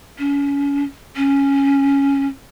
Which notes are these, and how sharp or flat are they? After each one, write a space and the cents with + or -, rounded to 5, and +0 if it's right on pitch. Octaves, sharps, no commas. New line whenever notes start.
C#4 +30
C#4 +0